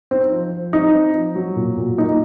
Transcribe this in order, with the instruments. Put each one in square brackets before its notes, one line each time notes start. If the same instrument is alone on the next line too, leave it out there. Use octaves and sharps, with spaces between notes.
[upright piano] C4 [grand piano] D#4
[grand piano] F3
F3
[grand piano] C4 [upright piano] D#4
[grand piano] C4
F3
F#3
A#2
A#2
[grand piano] A#3 [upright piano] D#4